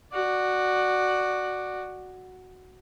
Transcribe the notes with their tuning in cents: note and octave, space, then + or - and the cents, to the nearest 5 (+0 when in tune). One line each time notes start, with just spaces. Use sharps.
F#4 +0 D5 +15